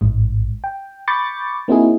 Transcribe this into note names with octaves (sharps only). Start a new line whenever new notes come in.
A1 G#2
G5
B5 C#6 D6 G6 A6 C#7
A#3 C4 D#4 E4 F#4 G#4